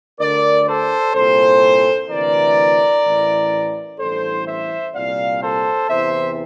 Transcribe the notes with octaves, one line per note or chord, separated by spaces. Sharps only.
D2 D3 A#4 D5
A4 C5
C2 A#2 A4 C5
D2 C3 E3 A#4 D5
A1 A2 E3
A1 G2 E3 A4 C5
C5 E5
C2 A#2 D5 F5
A4 C5
E2 C3 E3 C5 E5